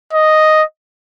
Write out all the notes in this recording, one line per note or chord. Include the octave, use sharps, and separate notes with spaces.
D#5